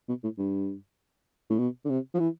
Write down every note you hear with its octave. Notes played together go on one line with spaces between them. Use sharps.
B2
A2
G2
A2
B2
D3
C3
F3
E3